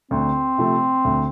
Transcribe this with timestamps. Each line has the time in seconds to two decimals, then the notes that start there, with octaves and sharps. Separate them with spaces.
0.11 D2 C4
0.58 C3 F3 A3
1.05 D2